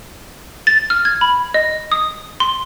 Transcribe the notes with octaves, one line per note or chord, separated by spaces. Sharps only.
A6
F6
G#6
B5
D#5
D#6
C6